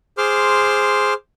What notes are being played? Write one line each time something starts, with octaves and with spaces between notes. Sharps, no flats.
G#4 C5 C6 D6 F6